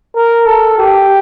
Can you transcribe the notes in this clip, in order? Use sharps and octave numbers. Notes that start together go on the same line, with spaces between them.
A#4
A4
G4